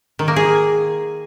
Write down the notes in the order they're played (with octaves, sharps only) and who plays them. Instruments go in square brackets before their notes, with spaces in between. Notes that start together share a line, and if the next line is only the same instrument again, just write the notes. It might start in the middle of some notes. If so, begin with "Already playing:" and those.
[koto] D#3
A#3
G#4